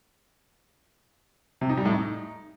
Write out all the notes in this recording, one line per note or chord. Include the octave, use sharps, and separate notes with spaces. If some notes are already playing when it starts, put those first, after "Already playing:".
C3
D#4
G3
A2
D#4